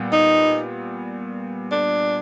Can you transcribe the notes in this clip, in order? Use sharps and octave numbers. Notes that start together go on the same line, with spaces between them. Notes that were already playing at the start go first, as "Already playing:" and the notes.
Already playing: A#2 G3 B3
D#4
D4